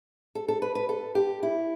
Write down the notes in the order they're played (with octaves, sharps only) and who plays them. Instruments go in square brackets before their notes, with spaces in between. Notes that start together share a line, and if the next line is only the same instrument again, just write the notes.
[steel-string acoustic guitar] A4
A4
B4
B4
A4
G4
E4